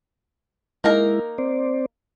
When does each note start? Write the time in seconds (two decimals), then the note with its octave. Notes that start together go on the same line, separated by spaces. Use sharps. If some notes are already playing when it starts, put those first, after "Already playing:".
0.84 G#3 A#3 D#4 E4 A#4
1.38 C4 C5 D5